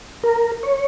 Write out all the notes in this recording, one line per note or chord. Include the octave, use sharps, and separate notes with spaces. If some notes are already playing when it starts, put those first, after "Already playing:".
A#4
C#5